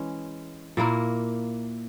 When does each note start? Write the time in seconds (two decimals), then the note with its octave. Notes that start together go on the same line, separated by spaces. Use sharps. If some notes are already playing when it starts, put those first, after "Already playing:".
Already playing: E3 G#3 C#4
0.77 A#2 A#3 E4 A#4